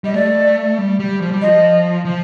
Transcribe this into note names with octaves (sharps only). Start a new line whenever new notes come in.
G3 D#5
A3 D5
G3
G3
F3
G3
F3 D#5
F3